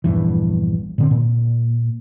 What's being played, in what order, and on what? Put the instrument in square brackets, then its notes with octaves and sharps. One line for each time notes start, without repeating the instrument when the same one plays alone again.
[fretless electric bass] A#1 E2 G2 E3
A#2 D3 C4
A#2